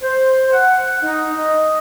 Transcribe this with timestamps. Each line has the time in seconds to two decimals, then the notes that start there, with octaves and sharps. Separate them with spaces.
0.02 C5
0.52 F#5
1.03 D#4
1.37 D#5